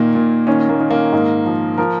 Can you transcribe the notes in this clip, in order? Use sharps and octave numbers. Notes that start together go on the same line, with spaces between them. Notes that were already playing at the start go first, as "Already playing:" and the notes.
Already playing: A#2 D#3 A#3
A#2
D#3 C#4
A#3
D#3
A#3
G#2
F3
F3 A#4